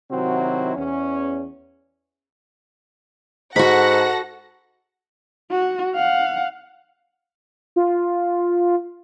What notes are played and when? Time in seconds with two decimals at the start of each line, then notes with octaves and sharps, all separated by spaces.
0.11 C3 D#3 F#3 C4 E4 F#4
0.76 E2 C#4
3.56 G#2 F#4 A4 F#5 B5 A#6
5.51 F#4
5.95 F5 F#5
7.76 F4